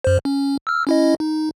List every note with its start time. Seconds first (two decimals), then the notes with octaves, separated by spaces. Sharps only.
0.04 F#2 C5
0.25 C#4
0.67 E6 F6
0.87 C#4 E4 D#5
1.20 D#4